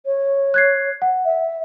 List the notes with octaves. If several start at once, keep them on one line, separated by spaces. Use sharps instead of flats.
C#5
F#6 G#6 C7
F#5
E5